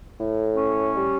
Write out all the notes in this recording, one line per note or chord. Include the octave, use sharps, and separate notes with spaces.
A2
C#4
G3